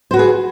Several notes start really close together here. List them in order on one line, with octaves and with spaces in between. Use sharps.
C5 F#4 B4 G#4